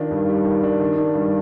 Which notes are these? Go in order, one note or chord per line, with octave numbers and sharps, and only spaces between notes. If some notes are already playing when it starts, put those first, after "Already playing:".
Already playing: D#3 D4 F4
G2
G3
D#3
D4
D#3
D4
G2